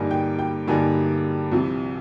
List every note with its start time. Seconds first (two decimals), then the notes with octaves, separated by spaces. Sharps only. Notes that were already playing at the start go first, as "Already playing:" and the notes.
Already playing: G2 D3 G3 A#3 D#4 G#5
0.11 G5
0.39 G5
0.68 G2 D3 G3 A#3 D#4 G#5
1.52 C2 C3 F3